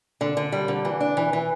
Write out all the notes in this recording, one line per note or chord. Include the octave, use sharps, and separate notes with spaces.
D3
D3
G3
D3
E3
D4
E3
E3